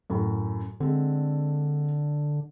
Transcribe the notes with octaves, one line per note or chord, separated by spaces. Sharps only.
F#2 A2
D3 G#3 C4